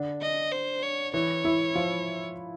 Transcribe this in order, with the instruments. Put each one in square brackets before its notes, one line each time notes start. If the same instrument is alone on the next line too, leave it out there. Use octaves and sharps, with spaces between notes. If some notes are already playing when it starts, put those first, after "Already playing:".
Already playing: [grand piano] D3 D4
[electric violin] D#5
C5
C#5
[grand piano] E3 E4 [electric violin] C#5
[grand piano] E3 E4
F3 F4